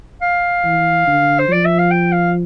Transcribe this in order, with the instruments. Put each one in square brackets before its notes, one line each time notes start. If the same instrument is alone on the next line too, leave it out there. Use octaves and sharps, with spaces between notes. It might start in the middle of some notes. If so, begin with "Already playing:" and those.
[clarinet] F5
[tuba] E3
D3
[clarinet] C5
[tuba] F3 [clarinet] D5
[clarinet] E5
F5
G5
F5